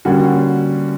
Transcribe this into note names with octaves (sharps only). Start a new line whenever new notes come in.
D3 G3 A#3 C#4 F#4